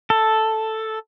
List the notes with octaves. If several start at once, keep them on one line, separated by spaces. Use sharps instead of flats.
A4